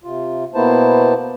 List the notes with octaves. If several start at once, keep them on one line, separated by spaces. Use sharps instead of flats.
C3 F4
B2 A#3 B3 E4 C5 A5